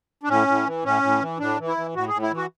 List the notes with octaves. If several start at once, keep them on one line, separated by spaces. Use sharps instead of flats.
D4
A2 C#4
A2
E3
A2 C#4
A2
E3
A2 D4
E3
E4
E3
A2 F#4
G#4
A2
E4
E3
F#4